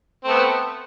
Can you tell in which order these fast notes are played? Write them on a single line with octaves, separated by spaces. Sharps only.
C4 A3 B3